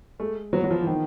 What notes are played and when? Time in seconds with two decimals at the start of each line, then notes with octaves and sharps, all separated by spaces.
0.20 G#3 A3
0.53 F#3 B3
0.64 F#3
0.71 F3
0.81 E3
0.87 D#3 F3